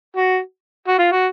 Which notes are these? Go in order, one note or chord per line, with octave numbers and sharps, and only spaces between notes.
F#4
F#4
F4
F#4